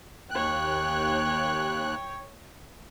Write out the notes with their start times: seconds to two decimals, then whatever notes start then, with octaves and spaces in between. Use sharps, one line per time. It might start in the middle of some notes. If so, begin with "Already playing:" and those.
0.31 D#2 C#5 G5 F#6